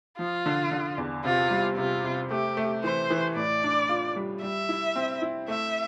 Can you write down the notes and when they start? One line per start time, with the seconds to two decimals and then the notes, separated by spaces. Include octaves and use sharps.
0.19 F3 F4
0.46 D3
0.71 D3
0.98 E2
1.25 C3 F4
1.51 G3
1.77 C3 F4
2.04 C3
2.31 A3 G4
2.57 A3
2.84 E3 C5
3.10 E3
3.36 A2 D5
3.64 D4
3.89 F4
4.16 G3
4.43 G3 E5
4.69 E4
4.96 C4
5.22 E4
5.48 A3 E5